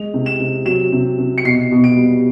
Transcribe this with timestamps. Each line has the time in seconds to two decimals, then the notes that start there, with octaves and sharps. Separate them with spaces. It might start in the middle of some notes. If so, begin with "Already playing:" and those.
Already playing: G#3 F7
0.14 C3
0.26 E7
0.40 C3
0.66 F#3 E7
0.92 C3
1.19 C3
1.38 C#7
1.44 B2 C7
1.71 B2
1.84 D7
1.97 G3